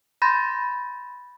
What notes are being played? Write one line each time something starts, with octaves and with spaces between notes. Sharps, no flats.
B5 C6 G6 A6 A#6